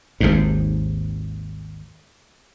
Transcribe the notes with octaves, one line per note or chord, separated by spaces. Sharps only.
G#1 D#2 G#2